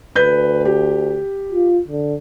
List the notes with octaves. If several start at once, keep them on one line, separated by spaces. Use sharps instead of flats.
D2 B4 G6
G4
F4
D3